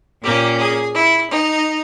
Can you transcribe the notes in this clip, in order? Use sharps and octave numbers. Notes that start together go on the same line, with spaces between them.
A#2 A#3 C#4 G4
G#4
E4
D#4